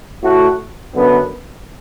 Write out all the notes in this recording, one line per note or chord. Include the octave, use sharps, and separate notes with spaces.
A2 A3 F#4
F#2 D3 B3